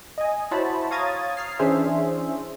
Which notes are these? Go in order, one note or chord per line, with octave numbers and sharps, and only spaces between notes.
D#5 G#5
E4 F#4 C5 C#5 A5 B5
C#5 F5 A#5 D#6 G#6 A6
F6 C7
E3 C#4 D4 G#4 C5 E5